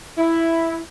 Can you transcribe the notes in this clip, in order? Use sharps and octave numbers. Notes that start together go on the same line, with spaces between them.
E4